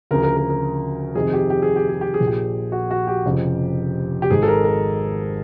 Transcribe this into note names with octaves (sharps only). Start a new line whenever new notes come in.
D2 C#3 F3 A#4
A#4
A#4
A#4
F2 C3 D#3 G#4
G4
G4
G#4
G4
G#4
G4
G#4
A#1 A#2 F3
G4
F#4
F#4
G4
F1 F2 C#3 F3
G4
G#1 G#2 D#3 G#4
A4
A#4
A#4